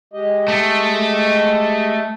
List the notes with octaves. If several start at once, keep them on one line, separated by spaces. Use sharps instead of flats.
G#3 G4 D#5
A3